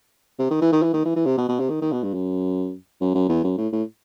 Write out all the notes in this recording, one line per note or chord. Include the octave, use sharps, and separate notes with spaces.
C3
D#3
E3
D#3
E3
D#3
E3
E3
C3
B2
B2
C3
D#3
D#3
B2
G2
F#2
F#2
F#2
E2
F#2
A2
A2